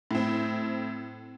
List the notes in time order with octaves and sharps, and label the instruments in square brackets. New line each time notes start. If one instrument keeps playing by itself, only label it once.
[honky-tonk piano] A2 C4